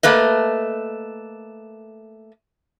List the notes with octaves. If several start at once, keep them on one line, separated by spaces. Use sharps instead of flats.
A3 A#3 B4 D#5